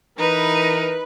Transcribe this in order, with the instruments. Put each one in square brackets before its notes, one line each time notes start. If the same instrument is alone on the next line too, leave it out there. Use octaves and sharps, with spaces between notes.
[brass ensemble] E3 A#4 [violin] D#4 [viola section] B4